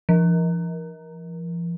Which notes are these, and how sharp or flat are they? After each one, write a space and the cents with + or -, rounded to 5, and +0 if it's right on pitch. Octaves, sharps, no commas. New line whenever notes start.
F3 -45